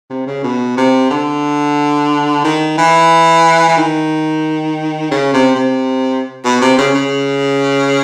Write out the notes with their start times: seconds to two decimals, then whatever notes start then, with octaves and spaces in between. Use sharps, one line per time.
0.10 C3
0.27 C#3
0.43 B2
0.77 C3
1.10 D3
2.44 D#3
2.78 E3
3.69 E3
3.77 D#3
5.11 C#3
5.33 C3
5.55 C3
6.45 B2
6.61 C3
6.78 C#3
6.94 C#3